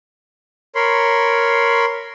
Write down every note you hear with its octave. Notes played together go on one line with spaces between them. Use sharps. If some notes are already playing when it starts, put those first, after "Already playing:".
A#4 C#5 B5 C6